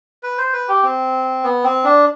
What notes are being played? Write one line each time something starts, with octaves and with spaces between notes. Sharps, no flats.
B4
C5
B4
G4
C4
B3
C4
D4